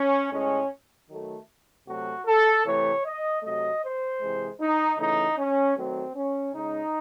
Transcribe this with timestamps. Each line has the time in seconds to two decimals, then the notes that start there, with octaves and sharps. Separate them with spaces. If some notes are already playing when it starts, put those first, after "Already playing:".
Already playing: C#4
0.32 A2 G#3 C#4
1.10 D#3 F#3 A3
1.87 C3 F#3 A3 F#4
2.27 A4
2.66 C3 E3 A3 C#5
3.05 D#5
3.43 C3 F#3 A3 D#5
3.83 C5
4.21 C3 E3 G#3
4.60 D#4
4.98 C#3 E3 A3 D#4
5.37 C#4
5.77 D#3 F#3 A3 C4
6.15 C#4
6.54 C#3 G#3 D#4